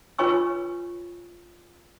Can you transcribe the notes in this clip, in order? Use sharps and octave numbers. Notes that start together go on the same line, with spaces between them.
F4 B4 C#5 G#5 C#6 E6